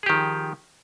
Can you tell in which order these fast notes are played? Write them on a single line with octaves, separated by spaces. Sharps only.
G#4 G4 D#3 F3